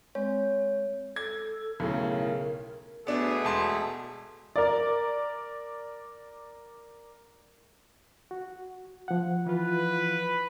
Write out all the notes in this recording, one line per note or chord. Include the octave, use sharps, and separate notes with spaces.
G#3 C4 C#5
A4 G#6
B1 A2 C#3
A#4
B2 A3 B3 D4 G#4
E1 A5 C6
A#4 D5
F#4
F3 F#5
E3 F4 B4